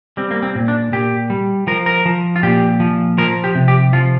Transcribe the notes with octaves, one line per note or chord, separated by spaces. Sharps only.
G3 C4
A#3
C4
A#2
D4
A#2 G4
G3
F3 A#4
A#4
F3
F4
A#2 G4
F3
F3 A#4
G4
C3
G4
F3 F4